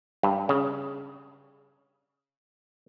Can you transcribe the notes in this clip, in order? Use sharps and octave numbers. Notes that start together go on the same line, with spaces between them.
G2
C#3